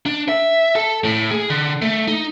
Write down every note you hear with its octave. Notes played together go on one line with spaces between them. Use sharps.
D4
E5
A4
A2
G#4
D3
A3
D#4